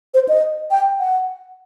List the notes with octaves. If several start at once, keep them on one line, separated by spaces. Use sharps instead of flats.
C5
D#5
G5
F#5